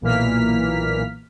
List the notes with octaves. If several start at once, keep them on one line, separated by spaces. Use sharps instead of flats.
B1 A#2 E3 A#3 F6 B6